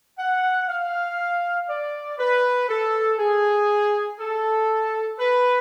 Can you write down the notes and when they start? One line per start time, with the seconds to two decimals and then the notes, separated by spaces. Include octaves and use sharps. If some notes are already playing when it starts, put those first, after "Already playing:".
0.19 F#5
0.69 F5
1.70 D5
2.19 B4
2.69 A4
3.19 G#4
4.20 A4
5.19 B4